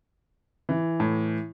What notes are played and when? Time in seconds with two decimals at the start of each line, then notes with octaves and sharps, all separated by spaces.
0.69 E3
1.00 A2